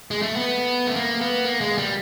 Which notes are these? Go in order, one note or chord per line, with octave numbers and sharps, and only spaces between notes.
G#3
A3
B3
A3
A#3
B3
A#3
G#3
G3